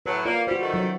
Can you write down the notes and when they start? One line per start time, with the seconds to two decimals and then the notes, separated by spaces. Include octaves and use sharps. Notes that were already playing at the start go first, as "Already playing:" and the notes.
0.06 A2 F#3 B4
0.25 A#3 F4 D5
0.47 G3 F#4 C5
0.61 D#3 A3
0.74 F#3 F#4 C#5